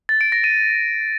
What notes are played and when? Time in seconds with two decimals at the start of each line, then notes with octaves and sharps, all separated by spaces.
0.09 A6
0.21 D7
0.32 A#6
0.44 D#7